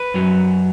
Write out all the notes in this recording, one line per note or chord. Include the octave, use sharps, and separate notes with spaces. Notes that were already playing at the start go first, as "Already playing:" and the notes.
Already playing: B4
F#2 F#3